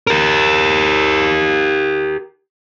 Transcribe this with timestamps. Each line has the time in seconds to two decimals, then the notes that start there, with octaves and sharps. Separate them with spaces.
0.07 G4 A#4